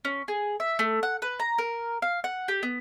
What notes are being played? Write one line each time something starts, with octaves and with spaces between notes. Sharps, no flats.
C#4
G#4
E5
A3
F#5
B4
A#5
A#4
F5
F#5
G4
B3